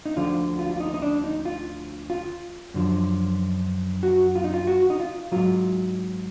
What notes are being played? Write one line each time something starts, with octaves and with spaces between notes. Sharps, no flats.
D#4
D2 D3 F3 F4
F4
F4
D#4
D#4
D4
D#4
F4
F4
F#2 D3 F3
F#4
F4
D#4
F4
F#4
D#4
F4
G#2 F#3 F4